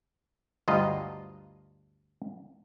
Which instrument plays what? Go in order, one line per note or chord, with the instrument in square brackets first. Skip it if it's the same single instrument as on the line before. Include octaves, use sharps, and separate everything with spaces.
[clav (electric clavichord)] D2 G2 F4 D#5 A#5